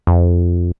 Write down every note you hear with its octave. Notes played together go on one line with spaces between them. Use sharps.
F2